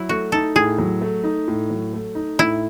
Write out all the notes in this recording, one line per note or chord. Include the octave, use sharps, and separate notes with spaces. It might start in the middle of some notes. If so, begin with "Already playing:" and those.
Already playing: F#3 E4
A3 F#4
D#4 A4
A2 G#4
F#3
A3
D#4
A2
F#3
A3
D#4
A2 E4